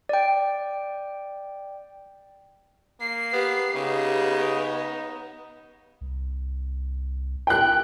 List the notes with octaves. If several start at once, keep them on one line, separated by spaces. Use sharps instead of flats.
D5 G5
A#3 C7
B3 G4
C#3 B3 D#4
C2
G5 F#6